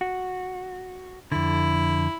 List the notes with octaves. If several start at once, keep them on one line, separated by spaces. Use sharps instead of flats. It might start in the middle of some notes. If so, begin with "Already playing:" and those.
F#4
F2 D3 E4